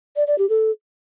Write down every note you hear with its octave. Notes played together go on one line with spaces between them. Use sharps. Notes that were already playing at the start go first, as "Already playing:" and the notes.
D5
D5
G4
A4